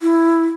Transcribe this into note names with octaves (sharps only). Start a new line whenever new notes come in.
E4